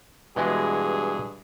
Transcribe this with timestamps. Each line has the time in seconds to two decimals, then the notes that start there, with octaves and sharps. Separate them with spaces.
0.36 G2 B2 E3 G#3 G#4